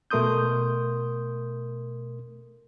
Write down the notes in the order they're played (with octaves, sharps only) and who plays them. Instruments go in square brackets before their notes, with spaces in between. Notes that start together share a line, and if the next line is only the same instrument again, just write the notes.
[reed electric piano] B2 A3 A#4 C6 D#6 G6